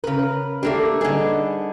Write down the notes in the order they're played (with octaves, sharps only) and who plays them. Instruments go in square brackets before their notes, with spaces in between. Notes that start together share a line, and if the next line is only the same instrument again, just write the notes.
[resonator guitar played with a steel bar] C#3 B4 [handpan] A#4
[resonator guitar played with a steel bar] A3 A#3 D4 [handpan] G4 A4
[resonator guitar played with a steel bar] D3 G#4 [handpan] G3 D#4 B4